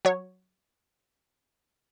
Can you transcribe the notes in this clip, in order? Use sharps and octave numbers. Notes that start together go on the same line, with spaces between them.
F#3 C#5